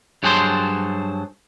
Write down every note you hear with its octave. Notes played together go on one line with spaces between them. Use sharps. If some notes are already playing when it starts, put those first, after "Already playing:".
G2 F#3 G#4 A4 C5 C6